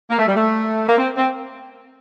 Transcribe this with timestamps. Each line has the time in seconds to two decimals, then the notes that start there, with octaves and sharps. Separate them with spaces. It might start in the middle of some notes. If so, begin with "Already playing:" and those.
0.10 A#3
0.19 A3
0.27 G3
0.36 A3
0.88 A#3
0.98 C4
1.17 C4